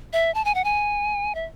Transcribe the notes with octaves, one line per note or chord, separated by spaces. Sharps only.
E5
A5
G#5
F#5
G#5
E5